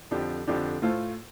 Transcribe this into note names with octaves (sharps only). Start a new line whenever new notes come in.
F2 D3 F3 D4 G4
F2 D3 F3 D4 G4
A2 A3 F4 A4 C5